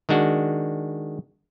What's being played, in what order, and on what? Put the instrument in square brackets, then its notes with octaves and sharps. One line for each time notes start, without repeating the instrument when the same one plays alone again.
[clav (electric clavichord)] D#3 G#3 D4 F#4